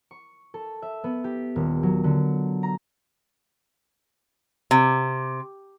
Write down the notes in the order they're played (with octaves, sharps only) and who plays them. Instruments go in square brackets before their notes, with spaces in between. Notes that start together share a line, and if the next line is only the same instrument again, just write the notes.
[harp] C#6
A4
E5
B3
G4
D#1
F#3
D3
A#5
[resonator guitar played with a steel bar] C3